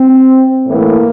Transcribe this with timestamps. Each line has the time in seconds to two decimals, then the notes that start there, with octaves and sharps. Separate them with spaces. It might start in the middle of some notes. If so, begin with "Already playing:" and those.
Already playing: C4
0.67 A2 E3 A3 A#3